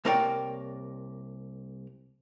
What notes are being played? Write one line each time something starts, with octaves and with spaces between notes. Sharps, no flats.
C2 A#3 A#4 C#5 D5 G5